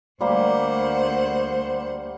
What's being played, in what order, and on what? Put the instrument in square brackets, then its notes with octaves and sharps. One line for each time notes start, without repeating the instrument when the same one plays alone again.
[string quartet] D2 F#5 [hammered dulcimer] G3 A#3 [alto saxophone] C5